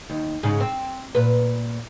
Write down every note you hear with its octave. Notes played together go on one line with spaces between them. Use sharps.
D#2
G#2 C#3
C4
A#2 B4